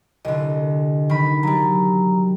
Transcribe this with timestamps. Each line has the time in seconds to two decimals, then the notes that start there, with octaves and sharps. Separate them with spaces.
0.25 C2 D3 D#5
1.09 D#3 B5
1.43 F#3 G3 A#5